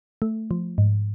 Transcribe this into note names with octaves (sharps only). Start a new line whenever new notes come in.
A3
F3
G#2